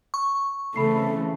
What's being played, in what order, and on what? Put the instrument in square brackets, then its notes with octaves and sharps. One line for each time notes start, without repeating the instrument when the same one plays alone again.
[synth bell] C#6
[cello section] C#3 E3 C4 [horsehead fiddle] A3 [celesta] A4 B5 C7